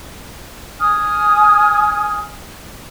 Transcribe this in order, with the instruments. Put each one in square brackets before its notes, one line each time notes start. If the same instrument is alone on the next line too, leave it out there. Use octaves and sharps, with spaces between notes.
[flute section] G#5 D#6 F6